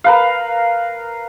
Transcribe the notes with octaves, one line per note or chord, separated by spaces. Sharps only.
A#4 B4 F5